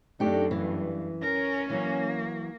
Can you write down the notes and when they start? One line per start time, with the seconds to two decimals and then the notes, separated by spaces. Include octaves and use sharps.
0.20 F#2 A3 D4 D#4 G4
0.51 G2 E3
1.22 C#4 A#4
1.70 E3 F#3 A#3